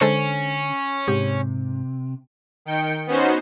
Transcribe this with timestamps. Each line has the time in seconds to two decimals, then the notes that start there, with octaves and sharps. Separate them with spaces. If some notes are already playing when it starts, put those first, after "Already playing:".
0.01 D3 G#3 C#4 A4 C5
1.08 G#2 C3 G4
2.65 D#3 G5 C#7
3.07 B3 C#4 D#4 F#4 C5